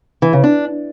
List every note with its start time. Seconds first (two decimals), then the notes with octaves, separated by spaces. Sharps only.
0.22 E3
0.33 C#3
0.44 D4